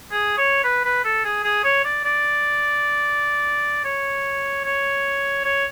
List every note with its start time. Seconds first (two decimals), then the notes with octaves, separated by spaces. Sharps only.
0.12 G#4
0.38 C#5
0.64 B4
0.84 B4
1.04 A4
1.24 G#4
1.44 G#4
1.64 C#5
1.85 D5
2.05 D5
3.84 C#5
4.65 C#5
5.44 C#5